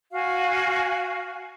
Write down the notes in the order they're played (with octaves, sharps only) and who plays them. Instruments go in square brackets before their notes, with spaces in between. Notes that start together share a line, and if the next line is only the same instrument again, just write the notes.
[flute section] F#4 F5 G#5